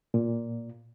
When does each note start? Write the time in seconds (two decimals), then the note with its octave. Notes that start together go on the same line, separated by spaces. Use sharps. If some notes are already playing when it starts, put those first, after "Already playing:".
0.14 A#2